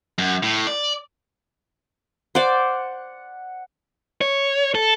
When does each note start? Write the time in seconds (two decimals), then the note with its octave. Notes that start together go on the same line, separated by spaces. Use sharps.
0.18 F#2
0.43 A2
0.67 D5
2.35 C5 D5 F#5
4.21 C#5
4.75 A4